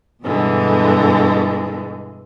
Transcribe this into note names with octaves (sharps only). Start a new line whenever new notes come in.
G2 B2 D3 E3 G#3